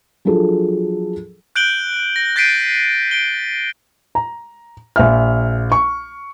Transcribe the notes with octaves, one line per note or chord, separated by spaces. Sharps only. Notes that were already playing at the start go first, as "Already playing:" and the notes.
F3 F#3 D4 G#4 A4
F#6 G6 D7 F#7 G7
A#6
G6 A6 B6 C7 D7 D#7
D7 G7
A#5
A#1 E5 F6
C#6